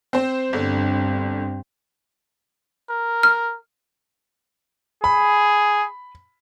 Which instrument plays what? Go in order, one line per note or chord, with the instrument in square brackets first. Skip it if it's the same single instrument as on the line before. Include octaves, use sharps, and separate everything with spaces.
[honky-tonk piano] C4 C5
[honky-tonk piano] G1 D3 [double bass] G2 C4
[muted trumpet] A#4
[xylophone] F6
[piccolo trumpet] G#4 [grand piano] B5